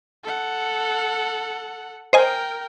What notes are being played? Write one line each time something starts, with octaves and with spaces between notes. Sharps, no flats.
A4 F#5
A#4 C5 D#5 G5 G#5